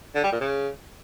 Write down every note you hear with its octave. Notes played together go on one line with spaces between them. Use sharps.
D3
G3
A#2
C#3